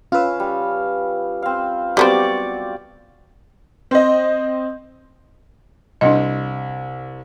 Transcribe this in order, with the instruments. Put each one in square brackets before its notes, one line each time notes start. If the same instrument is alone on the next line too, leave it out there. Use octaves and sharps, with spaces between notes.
[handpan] C#4 [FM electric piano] F4 B4 [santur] F5 E6
[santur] G3
C4 F5
[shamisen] G3 B3 C4 [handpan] F#4 D5 [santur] G4
[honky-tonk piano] C4 D#5
[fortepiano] C2 [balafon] D4 D#5